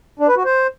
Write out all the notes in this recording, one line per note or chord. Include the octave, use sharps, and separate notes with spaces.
D4
B4
F#4
C5